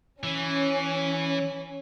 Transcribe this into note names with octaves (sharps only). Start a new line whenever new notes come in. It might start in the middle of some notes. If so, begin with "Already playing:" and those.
E3 C#4